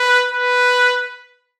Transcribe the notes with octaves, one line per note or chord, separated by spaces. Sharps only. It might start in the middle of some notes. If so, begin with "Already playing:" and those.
Already playing: B4
B4